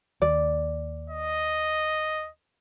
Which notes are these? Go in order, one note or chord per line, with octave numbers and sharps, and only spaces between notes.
D#2 D5
D#5